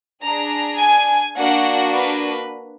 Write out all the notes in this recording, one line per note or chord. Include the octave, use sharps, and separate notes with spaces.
D4 G#4 A#5
G#5
A#3 D4 F#4 F#5
B4